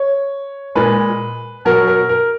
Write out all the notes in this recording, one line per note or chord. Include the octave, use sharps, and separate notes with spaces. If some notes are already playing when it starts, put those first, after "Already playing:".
Already playing: C#5
A#2 G#3 B4
B2 F#3 A#4
A#4
A#4